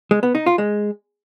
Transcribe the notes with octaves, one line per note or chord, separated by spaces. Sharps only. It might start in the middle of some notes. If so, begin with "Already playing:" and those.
G#3
B3
D#4
F4
G#3